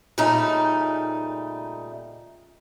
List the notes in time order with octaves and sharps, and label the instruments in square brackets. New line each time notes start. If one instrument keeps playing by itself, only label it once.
[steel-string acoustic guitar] A#2 C#3 G3 A3 D#4